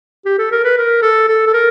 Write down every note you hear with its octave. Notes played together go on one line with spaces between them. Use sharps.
G4
A4
A#4
B4
A#4
A4
A4
A4
A#4